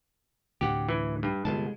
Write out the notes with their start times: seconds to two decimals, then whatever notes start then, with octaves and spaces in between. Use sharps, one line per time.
0.61 D2 A2 C3 G4 F#5
0.89 E3
1.23 G2
1.45 G1 C3 G#3 A5